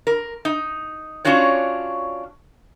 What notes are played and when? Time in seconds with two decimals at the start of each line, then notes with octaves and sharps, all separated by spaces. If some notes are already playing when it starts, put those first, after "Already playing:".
0.07 A#4
0.45 D#4
1.25 C#4 D4 F4 F#4 C#5